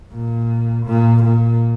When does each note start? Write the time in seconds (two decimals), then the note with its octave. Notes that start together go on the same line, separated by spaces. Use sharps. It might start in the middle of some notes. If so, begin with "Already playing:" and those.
0.12 A#2
0.86 A#2
1.23 A#2